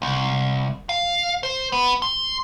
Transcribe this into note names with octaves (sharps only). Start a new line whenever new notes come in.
C2
F5
C5
B3
C6